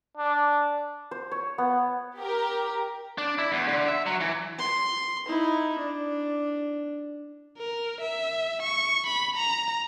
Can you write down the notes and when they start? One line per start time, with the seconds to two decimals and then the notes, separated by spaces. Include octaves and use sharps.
0.17 D4
1.11 C5
1.31 C#5
1.58 B3
2.20 G4 A#4
3.18 D4
3.38 E4
3.52 E2
3.68 D3
3.88 E5
4.06 F#3
4.21 E3
4.59 C6
5.28 D#4 E4
5.78 D4
7.58 A#4
8.01 E5
8.62 C#6
9.06 B5
9.36 A#5